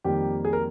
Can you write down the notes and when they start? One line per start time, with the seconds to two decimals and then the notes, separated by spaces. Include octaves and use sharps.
0.04 F2 D#3 G3 A#3 G4
0.45 G#4
0.53 A#4